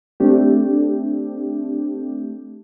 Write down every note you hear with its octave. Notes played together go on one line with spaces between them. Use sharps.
A3 C4 D4 G4